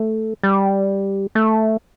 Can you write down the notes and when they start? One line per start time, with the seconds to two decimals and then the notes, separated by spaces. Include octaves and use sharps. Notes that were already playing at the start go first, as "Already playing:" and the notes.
Already playing: A3
0.43 G3
1.35 A3